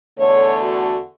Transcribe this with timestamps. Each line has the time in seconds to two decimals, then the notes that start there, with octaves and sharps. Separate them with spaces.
0.18 E2 D3 A3 C#5
0.59 F#4